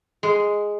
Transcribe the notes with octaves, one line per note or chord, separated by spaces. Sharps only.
G#3